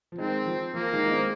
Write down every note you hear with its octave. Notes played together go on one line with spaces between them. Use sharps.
F3
D#3 G#3 C4
F3
F3 A#3
D#3 G#3
D#4
G#3 C4